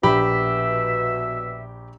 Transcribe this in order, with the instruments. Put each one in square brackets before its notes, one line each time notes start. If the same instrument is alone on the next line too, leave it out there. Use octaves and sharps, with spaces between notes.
[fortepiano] A#1 G4 B5 [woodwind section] B2 E5